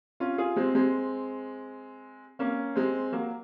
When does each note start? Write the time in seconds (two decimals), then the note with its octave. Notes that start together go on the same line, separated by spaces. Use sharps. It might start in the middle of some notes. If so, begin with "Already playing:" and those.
0.20 C#4 F4
0.38 F4 G#4
0.56 G#3 C4
0.75 G#3 C4
2.39 A#3 C#4
2.76 G#3 C4
3.12 F#3 A#3